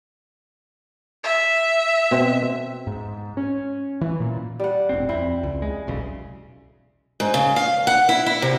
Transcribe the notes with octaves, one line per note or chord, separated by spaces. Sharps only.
E5
B2 C4
G#2
C#4
E3
A#2
G3 F#5
E1 A1 C4
F2 C4 E4
C#2
G#3
E1 B1 C#3
G#2
C#3
F5
F#5
E4
E4
C3